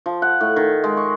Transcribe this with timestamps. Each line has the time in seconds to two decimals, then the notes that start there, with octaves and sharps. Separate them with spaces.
0.06 F3
0.22 F#5
0.41 A2
0.56 D#3
0.84 G#3
0.97 C#6